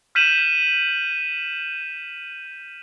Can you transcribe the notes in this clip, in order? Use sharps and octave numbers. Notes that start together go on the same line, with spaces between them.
F6 G6 B6 D#7 E7 F#7